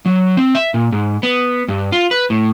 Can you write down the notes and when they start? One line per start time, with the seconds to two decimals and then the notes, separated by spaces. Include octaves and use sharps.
0.06 F#3
0.37 C4
0.55 E5
0.74 A#2
0.92 G#2
1.23 B3
1.68 G2
1.92 F4
2.11 B4
2.30 A2